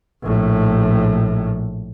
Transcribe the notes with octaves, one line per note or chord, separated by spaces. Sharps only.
A#1 A2